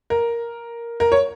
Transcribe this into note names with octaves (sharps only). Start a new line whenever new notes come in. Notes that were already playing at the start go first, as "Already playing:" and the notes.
A#4
A#4
C#5